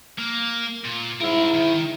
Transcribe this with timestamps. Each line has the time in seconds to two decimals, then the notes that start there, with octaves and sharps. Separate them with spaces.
0.19 A#3
0.84 A#2
1.21 G#2 E4 A#4 E5
1.54 D#3